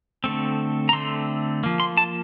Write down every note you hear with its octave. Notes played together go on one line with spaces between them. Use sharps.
D3 A3 C4
A#5
D3 A3 C4 C6
F3 A#3
C6
A5